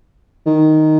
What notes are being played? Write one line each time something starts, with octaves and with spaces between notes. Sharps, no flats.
D#3